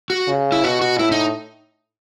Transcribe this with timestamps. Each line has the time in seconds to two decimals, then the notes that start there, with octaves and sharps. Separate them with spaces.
0.10 F#4
0.28 C#3
0.52 E4
0.64 B2 F#4
0.81 F#4
0.99 A2 E4
1.12 D#4